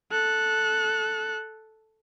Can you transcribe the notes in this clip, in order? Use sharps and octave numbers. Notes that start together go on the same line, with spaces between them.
A4 F#6